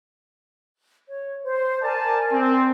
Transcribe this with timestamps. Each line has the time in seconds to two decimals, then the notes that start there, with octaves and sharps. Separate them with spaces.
1.08 C#5
1.43 C5
1.82 A#4 D5 G#5 A5
2.32 C4